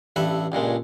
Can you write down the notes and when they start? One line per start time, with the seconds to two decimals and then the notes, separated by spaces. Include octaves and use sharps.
0.16 A1 G2 A4 B4 E5
0.52 C#2 G2 A#2 G#3